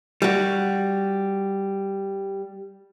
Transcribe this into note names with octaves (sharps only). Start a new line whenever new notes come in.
G3 F#4